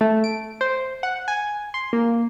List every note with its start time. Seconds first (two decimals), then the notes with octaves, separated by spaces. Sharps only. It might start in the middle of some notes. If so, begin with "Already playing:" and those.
0.01 A3
0.24 D7
0.61 C5
1.03 F#5
1.28 G#5
1.74 C6
1.93 A#3